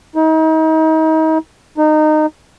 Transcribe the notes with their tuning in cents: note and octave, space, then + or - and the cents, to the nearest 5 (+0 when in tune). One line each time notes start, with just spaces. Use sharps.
D#4 +35
D#4 -20